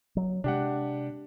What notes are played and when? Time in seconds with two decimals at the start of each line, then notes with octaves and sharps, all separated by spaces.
0.17 F#3
0.44 C3 G#3 D4 G4 F#5